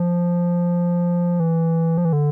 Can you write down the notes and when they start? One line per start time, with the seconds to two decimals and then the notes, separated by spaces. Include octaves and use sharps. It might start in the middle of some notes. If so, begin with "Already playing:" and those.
Already playing: F3
1.40 E3
1.98 F3
2.05 E3
2.13 D3